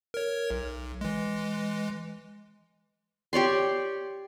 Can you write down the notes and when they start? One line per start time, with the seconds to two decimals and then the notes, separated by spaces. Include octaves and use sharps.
0.14 A#4 C#5
0.51 B1
1.01 E3 G#3
3.33 G4 C#5 D5 C6